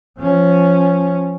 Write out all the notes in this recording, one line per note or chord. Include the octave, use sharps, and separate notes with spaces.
F3 C#4